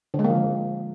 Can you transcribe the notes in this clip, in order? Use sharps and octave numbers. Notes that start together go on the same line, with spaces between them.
D3
G#3
A#3
F3
D3